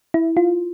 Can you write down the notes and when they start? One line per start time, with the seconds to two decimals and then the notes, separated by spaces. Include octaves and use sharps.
0.14 E4
0.37 F4